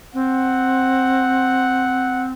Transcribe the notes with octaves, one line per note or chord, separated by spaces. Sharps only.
C4 F#5